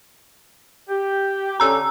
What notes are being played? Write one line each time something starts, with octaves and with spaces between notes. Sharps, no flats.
G4
D3 C#4 A#5 E6